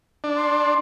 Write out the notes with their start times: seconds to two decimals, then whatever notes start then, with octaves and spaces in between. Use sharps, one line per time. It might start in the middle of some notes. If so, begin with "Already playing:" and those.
0.24 D4
0.36 C6